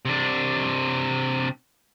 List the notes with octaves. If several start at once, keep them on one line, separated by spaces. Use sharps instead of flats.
C3 D4